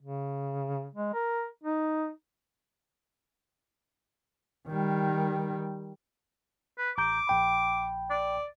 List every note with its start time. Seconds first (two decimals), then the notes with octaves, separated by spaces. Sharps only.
0.01 C#3
0.95 G#3
1.14 A#4
1.64 D#4
4.68 D#3 G3
6.78 B4
6.98 A1 A#5 D6 G6
7.27 A#1 G5 B5
8.10 D5